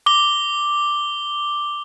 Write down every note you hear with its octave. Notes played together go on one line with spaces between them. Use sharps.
D6 G7